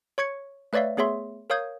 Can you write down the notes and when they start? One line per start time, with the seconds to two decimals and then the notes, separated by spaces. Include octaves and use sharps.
0.18 C#5 C#6 G#6 C#7
0.73 A3 B4 C#5 D5 E5 F5
0.97 A3 B3 G#4 C#5 E5 C6
1.50 A#4 C#5 F5 D#6 G6 G#6